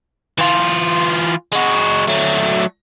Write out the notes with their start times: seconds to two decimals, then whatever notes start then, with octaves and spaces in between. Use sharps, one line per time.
0.39 E3 F4
1.52 G#3 F#4
2.07 F#3 A3